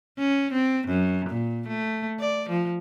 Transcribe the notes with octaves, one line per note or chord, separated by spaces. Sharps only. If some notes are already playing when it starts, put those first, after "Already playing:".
C#4
C4
F#2
A#2
A3
D5
F3